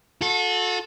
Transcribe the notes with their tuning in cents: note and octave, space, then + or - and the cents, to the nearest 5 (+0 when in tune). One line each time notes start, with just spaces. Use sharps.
F#4 -40 A4 -10